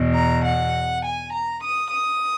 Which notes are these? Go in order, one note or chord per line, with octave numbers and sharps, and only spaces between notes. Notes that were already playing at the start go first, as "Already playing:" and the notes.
Already playing: E2 B2
A#5
F#5
G#5
A#5
D#6
D#6